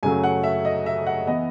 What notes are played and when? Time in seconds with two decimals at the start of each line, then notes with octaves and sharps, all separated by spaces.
0.03 F#2 C#3 F#3 A3 G#5
0.23 F#5
0.44 E5
0.65 D#5
0.86 E5
1.07 F#5
1.27 E3 B3 E4 D#5